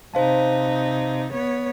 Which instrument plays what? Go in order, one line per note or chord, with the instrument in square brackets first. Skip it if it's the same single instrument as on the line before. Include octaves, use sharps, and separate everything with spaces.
[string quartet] C3 D#4 [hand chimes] C5 F5 A5
[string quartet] B3 C#5